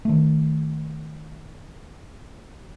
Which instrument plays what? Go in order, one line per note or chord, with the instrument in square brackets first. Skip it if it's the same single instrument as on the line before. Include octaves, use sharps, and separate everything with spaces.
[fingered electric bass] D#3 A3